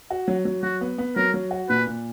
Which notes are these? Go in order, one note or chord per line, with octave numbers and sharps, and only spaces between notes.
F#4
F#3
F#3
F#3 F#4
B3
B3
F#3 A#4
F#3
F#4
A#2 B4
A#2